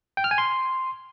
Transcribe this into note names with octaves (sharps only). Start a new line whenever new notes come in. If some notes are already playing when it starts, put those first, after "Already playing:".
G5
F6
G#5
C6